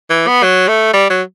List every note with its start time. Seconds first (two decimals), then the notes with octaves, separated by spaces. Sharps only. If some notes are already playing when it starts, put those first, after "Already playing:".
0.10 E3
0.27 B3
0.43 F#3
0.68 A3
0.93 G3
1.10 F#3